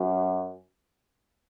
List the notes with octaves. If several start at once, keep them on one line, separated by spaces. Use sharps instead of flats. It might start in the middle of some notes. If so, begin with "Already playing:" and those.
Already playing: F#2